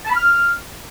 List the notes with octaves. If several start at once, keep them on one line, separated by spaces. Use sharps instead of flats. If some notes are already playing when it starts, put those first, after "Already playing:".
A5
B5
F6